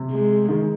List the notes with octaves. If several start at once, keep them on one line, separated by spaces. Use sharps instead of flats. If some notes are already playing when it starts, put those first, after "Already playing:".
Already playing: C3
G#3
D#3